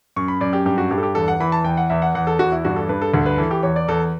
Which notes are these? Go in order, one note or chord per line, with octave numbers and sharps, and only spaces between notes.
F#2 C#6
B5
F#2 D5
G4
G2 G4
F#4
G2 G4
A4
G4
E2 A4
F#5
E3 B5
A5
E2 G5
F#5
E2 E5
F#5
E2 F#5
A4
E2 F#4
E4
G2 F#4
A4
G2 B4
A4
D2 A4
B4
E3 A4
G4
E2 C#5
D5
E2 A4